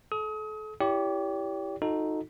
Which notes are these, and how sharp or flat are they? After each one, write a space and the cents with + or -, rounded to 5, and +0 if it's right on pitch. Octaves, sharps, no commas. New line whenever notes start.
A4 -35 D#6 +35
E4 +0 G4 +0 C#5 +45
D#4 +0 F#4 -40 A4 +0